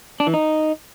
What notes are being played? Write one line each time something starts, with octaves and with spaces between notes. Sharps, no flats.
D4
E3
D#4